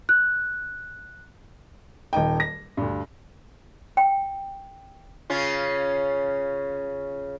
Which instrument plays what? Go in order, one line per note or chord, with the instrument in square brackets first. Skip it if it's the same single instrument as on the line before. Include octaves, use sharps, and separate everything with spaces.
[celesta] F#6
[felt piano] D#1 D#4 D#5 G5
A#6
D2 G2
[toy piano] G5
[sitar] C#3 C#4 F4